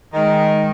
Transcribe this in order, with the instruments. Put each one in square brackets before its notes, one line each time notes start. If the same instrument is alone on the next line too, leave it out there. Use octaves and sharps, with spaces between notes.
[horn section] D#3 [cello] G#3